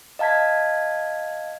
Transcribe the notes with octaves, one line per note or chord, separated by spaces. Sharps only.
D#5 F5 A5 G#6 B6